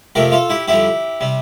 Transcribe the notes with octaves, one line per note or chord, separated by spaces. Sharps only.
F2 C3 F3 A3 G4 A#4
F4 A4
E4 G4
F2 D3 G3 E4 G4
C3 G3